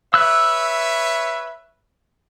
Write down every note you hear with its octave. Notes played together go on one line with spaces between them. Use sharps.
B4 C#5 E5 E6 F#6